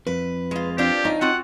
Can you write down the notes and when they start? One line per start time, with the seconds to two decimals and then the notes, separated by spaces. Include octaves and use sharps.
0.07 F2 B4
0.51 G#3 F4
0.78 C4 D4 F4 G4
1.05 C#4 D#4 C#5
1.21 C4 F4 F#4 F#5